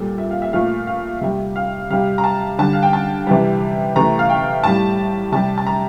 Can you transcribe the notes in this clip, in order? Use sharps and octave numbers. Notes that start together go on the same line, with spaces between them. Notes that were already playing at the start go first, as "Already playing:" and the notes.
Already playing: A#2 G3 A4
E5
F5
E5
A#2 F3 A3 F5
F5
C3 G3 E5
F5
C3 G3 F5
A#5
A5
D3 G3 A5
F5
G5
A5
C3 E3 G3
C3 E3 A3 A#5
F5
G5
A2 G3 A5
C3 G3 A5
A5
A#5